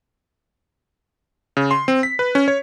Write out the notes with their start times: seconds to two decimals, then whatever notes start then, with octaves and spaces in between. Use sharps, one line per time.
1.57 C#3
1.71 C6
1.88 C4
2.03 B6
2.19 B4
2.35 C#4
2.48 C#5